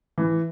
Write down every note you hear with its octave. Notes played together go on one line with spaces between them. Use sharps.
E3